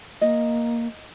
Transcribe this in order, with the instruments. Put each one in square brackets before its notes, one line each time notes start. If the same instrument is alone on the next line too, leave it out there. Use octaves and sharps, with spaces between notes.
[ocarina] A#3 [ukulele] D#5